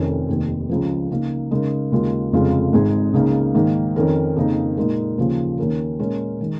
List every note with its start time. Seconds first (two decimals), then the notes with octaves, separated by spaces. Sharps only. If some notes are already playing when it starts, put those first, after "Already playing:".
Already playing: F1 F2 D#3 C#4 A#4
0.29 F1 D#2 D#3
0.69 C#2 C#3 F3
1.10 C#3 A#3 D#4
1.51 C#3 G#3 D#4 A#4
1.92 D#2 C#3 G#3 F4 A#4
2.32 F1 F2 C#3 G#3 F4
2.73 G#1 G#2 G#3 D#4 G#4
3.13 C#2 C#3 A#3 D#4
3.55 G#2 D#3 A#3
3.96 F2 D#3 C#4 A#4
4.36 F2 C#3 A#3 D#4
4.77 A#2 G#3 D#4 A#4
5.18 D#2 C#3 F3 A#3
5.58 D#2 D#3 C#4 A#4
5.99 A#2 G#3 C#4 A#4
6.40 D#3 G#3